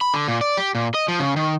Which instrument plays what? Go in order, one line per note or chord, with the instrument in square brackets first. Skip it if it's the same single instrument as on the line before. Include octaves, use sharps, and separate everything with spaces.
[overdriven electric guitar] B5
D3
A#2
D5
G4
A#2
D#5
F3
C#3
D#3